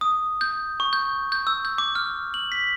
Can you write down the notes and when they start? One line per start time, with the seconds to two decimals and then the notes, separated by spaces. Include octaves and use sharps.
0.01 D#6
0.41 G6
0.80 C#6
0.93 G6
1.32 G6
1.47 E6
1.65 G6
1.78 D6
1.95 F6
2.34 F#7
2.52 B6